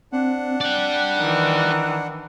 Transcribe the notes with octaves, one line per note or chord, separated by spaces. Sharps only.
C4 D4 F#5
D5 G5 F#6
D#3 E3